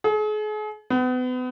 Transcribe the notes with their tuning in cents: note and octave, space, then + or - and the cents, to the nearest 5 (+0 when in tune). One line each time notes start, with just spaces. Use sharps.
G#4 +40
B3 +35